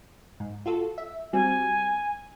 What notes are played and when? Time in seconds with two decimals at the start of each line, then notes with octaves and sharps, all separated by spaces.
0.40 G#2
0.66 F4 F#4 A4
0.98 E5
1.33 G3 C4 F#4 G#5